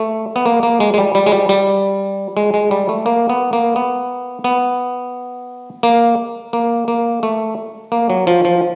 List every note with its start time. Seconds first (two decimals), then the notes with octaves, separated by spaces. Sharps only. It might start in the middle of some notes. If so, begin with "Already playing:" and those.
Already playing: A3
0.36 B3
0.46 A#3
0.63 A#3
0.80 G#3
0.94 G#3
0.98 G3
1.15 G3
1.26 G#3
1.32 G3
1.49 G3
2.37 G#3
2.54 G#3
2.71 G3
2.89 A3
3.06 A#3
3.29 B3
3.53 A#3
3.76 B3
4.44 B3
5.83 A#3
6.53 A#3
6.88 A#3
7.23 A3
7.92 A#3
8.10 F#3
8.27 F3
8.45 F3